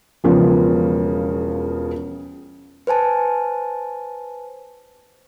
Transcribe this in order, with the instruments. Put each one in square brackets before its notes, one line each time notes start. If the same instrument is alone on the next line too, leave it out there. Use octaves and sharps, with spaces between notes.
[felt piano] E1 C#3 F3 B3
[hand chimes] B4 C5 G#5 A5